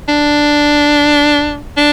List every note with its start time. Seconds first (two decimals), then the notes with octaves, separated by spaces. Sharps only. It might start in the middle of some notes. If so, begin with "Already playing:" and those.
0.08 D4
1.77 D4